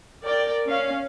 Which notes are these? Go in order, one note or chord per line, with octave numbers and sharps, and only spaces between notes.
A#4 D5 G5
C#4 F5